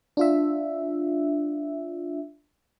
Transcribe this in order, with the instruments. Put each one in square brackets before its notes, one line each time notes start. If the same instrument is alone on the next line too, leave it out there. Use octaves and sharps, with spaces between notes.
[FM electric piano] D4 F4 E5